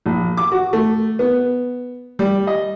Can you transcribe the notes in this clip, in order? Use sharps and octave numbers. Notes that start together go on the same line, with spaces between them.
A#1
D6
F#4
A3
B3
G3
D#5